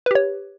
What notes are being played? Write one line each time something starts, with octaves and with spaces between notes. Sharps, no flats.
G4 B4 C#5